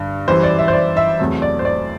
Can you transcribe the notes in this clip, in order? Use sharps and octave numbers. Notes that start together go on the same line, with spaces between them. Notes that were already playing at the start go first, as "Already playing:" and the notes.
Already playing: G2 D3
F#2 E3 G3 C5
D5
E5
C5
D5
E5
E2 C3 F#3 A3
D5
C5
D5